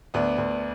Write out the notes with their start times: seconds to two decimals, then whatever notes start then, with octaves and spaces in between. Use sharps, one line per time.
0.14 D2 B3 D4
0.38 D2